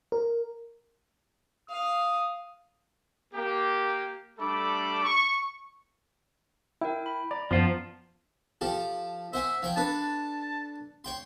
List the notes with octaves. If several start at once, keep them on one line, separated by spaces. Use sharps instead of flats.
A#4
F5 D#6
A#3 G4
G3 A3 D4 A4 B5 D6
C#6
E4 A#4 G5
B5
D5 A#5
F#2 F3 B3 F4 C5 A5
F3 G4 A4
C5 E5 F#5 G#5
F3 C#5 G5
D4 A4 B4 A5
C#5 G5 C6